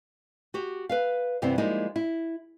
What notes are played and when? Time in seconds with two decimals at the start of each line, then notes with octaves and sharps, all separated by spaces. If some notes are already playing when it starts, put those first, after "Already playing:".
0.54 F#4 G4
0.89 B4 E5 F5
1.42 G2 C3 E3 B3 C4 E4
1.58 F3 G3 G#3 A#3 D#4 E4
1.96 E4